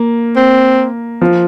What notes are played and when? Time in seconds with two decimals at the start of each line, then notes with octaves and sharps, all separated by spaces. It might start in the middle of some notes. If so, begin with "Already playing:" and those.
Already playing: A#3
0.36 C4
1.22 F3